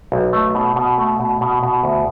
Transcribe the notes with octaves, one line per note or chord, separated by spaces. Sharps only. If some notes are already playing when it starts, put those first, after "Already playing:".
B1
A3
B2
B2
A3
B2
B2
B2
D2